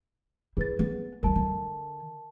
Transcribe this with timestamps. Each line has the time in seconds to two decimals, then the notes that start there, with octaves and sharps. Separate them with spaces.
0.57 E4 G#4 B4 A6
0.79 B3
1.23 C2 G3 A#4 A5
1.35 D3